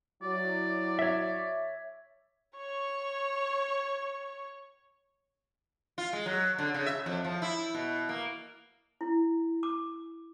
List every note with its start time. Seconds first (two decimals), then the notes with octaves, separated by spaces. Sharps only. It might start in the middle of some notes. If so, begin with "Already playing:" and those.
0.22 F#3 E4 D5
0.99 C#5 E5
2.57 C#5 C#6
5.98 F4
6.13 G#3
6.26 F#3
6.58 D3
6.74 C#3
6.86 E5
7.06 F2
7.24 F3
7.42 E4
7.75 B2
8.09 A#3
9.01 E4
9.63 D6